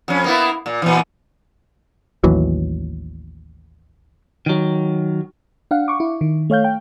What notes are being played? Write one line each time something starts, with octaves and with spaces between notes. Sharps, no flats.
F2 C#4
A#3 B3 E4
A#2
A#2 E3
A1 D#2 E3 F#3
D#3 F#3
D4 F5 F#5
C#6 D6
E4
D#3
A3 C#5 F5 G6
G5